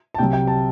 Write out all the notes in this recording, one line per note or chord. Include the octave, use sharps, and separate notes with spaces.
A5
C2 C3 F#3 G5
G5
A5